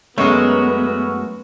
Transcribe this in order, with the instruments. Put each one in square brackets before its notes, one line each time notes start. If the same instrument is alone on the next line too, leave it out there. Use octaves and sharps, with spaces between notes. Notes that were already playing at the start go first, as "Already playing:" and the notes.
[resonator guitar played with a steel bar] F#2 G#3 [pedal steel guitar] A3 F#4 A#4 [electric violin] B3 [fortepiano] C#5 D#5